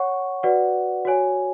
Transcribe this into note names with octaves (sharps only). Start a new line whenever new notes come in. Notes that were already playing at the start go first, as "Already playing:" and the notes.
Already playing: C#5 F#5 C#6
F#4 B4 D5 F#5
F#4 C#5 G#5